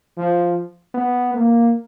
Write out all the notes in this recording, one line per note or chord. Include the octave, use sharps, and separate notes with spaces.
F3
B3
A#3